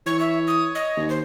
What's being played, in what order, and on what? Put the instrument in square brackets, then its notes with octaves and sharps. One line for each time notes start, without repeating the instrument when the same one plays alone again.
[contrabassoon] E3 [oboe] C#5 [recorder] C#6
[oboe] C#5 [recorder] E5
[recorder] D#6
D#5
[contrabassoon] D#2
[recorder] C5